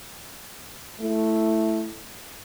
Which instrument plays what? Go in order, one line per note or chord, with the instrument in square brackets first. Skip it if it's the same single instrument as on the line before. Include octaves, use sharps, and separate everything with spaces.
[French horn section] A3 E4